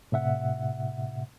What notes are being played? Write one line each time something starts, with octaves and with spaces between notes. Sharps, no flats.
A2 C3 E5 F#5